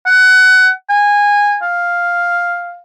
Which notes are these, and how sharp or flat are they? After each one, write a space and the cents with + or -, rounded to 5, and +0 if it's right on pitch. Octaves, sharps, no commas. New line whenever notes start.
F#5 +20
G#5 -15
F5 +5